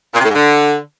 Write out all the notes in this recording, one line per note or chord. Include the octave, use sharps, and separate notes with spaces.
A#2
C3
A2
G#2
D3